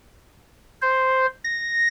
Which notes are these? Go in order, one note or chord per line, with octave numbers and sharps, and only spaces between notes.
C5
A#6